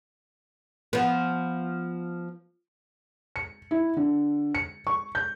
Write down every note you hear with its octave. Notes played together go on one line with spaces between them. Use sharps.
F3 B3
C#7
E4
D3
C#7
C#6
G6